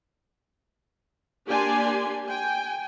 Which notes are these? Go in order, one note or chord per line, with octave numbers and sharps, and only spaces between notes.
A#3 D4 G4 D5 G#5 C6
G5 G#5